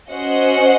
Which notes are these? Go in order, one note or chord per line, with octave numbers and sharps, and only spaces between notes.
C#4 F#4 C5 D#5 F#5